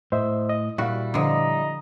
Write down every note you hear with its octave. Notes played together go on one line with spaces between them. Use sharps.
A2 C5 D#5 E5
D#5
A#2 G3 E4 F#4 F5
D3 F3 D#5 A#5